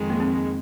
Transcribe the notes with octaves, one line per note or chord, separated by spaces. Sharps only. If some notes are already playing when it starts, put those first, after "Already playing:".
Already playing: F2 D#3 G#3
A#3
C4